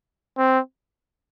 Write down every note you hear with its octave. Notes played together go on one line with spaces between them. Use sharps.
C4